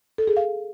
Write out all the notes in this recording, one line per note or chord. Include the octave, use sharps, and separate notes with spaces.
A4
G#4
F5